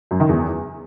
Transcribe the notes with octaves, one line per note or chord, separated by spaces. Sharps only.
F#2
D#3
E2